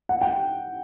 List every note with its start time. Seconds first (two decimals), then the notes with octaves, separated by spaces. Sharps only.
0.09 F#5
0.21 G5